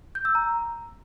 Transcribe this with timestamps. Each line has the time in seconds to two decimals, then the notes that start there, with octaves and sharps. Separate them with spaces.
0.15 G6
0.25 E6
0.35 A#5